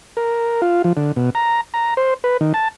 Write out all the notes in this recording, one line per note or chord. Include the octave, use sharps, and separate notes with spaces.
A#4
F4
F3
D3
B2
A#5
A#5
C5
B4
D#3
A5